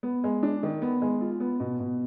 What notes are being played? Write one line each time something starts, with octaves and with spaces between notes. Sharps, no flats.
B3
G#3
D4
D#3
B3
G#3
F4
B3
B2
B2